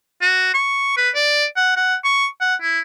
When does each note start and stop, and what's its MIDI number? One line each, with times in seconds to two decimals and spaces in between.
0.22 0.51 66
0.54 0.96 85
0.97 1.10 71
1.15 1.45 74
1.57 1.72 78
1.76 1.95 78
2.04 2.27 85
2.41 2.55 78
2.62 2.80 64